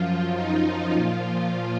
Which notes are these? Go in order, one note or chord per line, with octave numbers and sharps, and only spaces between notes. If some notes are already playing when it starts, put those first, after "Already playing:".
Already playing: F#2 F3 F4
D#4
A#2 F3 F4